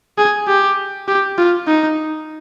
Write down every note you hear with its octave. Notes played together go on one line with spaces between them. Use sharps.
G#4
G4
G4
F4
D#4